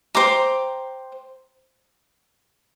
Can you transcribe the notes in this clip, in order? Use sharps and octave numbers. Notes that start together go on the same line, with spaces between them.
C5 G5 A#5 D6